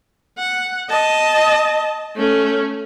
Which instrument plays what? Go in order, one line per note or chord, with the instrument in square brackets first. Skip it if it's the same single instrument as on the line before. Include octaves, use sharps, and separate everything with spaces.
[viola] F#5
D#5 A5
A3 C#4